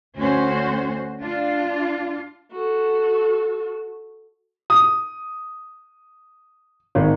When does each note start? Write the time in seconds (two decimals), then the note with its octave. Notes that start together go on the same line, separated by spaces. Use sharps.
0.16 D2 C#4 F#4 C5
1.21 D4 F4
2.52 F#4 A4
4.70 D#6
6.95 G#1